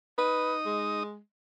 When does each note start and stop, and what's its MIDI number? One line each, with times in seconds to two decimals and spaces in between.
0.18 1.03 63
0.18 0.54 71
0.18 1.03 87
0.65 1.18 56